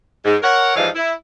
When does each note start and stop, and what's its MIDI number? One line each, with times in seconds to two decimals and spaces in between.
0.25 0.36 44
0.43 0.74 70
0.43 0.74 73
0.43 0.74 78
0.76 0.88 43
0.76 0.88 52
0.76 0.88 53
0.76 0.88 56
0.76 0.88 63
0.76 0.88 77
0.95 1.13 64